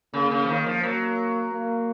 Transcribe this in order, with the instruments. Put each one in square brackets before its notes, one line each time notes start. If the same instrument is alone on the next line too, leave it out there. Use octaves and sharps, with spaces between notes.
[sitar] C#3 [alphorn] A#3
[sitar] C#3
F3
[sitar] D#3 [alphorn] A#3
[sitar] F3
[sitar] F#3 [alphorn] A#3
[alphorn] A#3